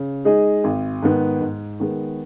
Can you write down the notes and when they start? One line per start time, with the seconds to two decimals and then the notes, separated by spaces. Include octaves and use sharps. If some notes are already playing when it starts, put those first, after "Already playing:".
Already playing: C#3
0.25 G#3 D#4 G#4 D#5
0.64 G#1
1.03 G#2 D#3 B3
1.41 G#2
1.80 D#3 G#3 B3